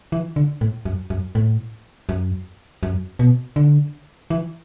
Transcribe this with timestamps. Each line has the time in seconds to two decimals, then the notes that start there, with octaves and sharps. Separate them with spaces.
0.12 E3
0.36 D3
0.61 A2
0.85 F#2
1.10 F#2
1.35 A2
2.09 F#2
2.83 F#2
3.19 B2
3.56 D3
4.30 E3